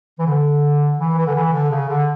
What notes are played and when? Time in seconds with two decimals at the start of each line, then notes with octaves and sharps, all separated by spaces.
0.19 E3
0.26 D3
0.98 E3
1.16 E3
1.26 D3
1.35 E3
1.52 D3
1.71 C#3
1.88 D3